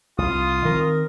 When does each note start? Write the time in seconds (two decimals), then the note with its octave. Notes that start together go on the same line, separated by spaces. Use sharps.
0.18 C2 F4 D#6
0.65 D#3 C4 A#4